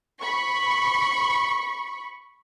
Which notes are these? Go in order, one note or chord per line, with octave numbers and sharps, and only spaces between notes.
B5 C#6